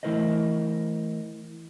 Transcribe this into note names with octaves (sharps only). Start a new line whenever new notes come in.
E3 A3 E4 A#4 C5 D#5